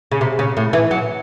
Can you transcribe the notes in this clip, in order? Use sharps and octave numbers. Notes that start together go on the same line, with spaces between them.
C#3
C3
C#3
A2
E3
F#3